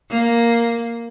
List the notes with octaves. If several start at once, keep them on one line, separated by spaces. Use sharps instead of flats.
A#3